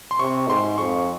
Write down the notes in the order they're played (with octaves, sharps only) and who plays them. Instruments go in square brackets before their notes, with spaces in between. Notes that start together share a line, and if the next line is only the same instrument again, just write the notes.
[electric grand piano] C6
[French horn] C3 [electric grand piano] C#6
[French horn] G#2 [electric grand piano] C6
[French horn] F2 [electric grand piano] C#6